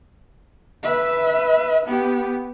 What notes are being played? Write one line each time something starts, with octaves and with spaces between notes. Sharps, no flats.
B4 E5
B3 G4